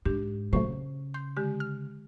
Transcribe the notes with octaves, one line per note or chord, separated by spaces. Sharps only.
G#2 D4 G4
A#2 C#3 F#3 A3 C5 C#6
C6 G6
D3 G#3 G4
F6